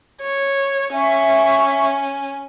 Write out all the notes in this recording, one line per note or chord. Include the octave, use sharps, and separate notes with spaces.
C#5
C#4 E5 C#6